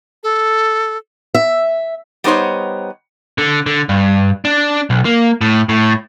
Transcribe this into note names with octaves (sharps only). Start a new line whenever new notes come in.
A4
E5
G3 B3 D#4 C5 C#5
D3
D3
G2
D4
B1
A#3
A2
A2